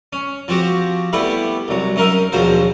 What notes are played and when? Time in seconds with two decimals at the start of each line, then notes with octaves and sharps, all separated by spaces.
0.13 C#4
0.48 F3 C4 F#4 G4
1.13 G3 A3 B3 E4 G4 B5
1.68 C2 F#3
1.96 F#2 D#4 A#4 E5
2.32 A#1 D#2 B2 F3 F#3 C5